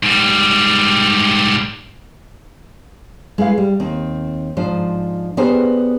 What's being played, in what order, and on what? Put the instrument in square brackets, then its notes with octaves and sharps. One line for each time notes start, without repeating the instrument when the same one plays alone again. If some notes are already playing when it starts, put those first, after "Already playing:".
[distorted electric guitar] G#2 G3
[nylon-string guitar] G#3 E4 B4 F5
G3
D#2 C4
G#2 F3 D4 C5
B3 D4 G4 G#4 A#4 C5